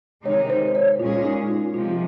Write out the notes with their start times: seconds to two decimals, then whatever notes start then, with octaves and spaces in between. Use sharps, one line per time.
0.25 C3 D#3 G#3 D#4 C#5
0.50 C5
0.75 C#5
0.99 A#2 G#3 C#4 F4 G#4
1.24 D#4
1.49 F4
1.74 C3 F3 G#3 F4